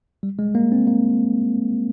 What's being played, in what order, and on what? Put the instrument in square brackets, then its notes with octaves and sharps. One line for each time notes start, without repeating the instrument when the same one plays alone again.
[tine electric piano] G3
G#3
A#3
C4
A#3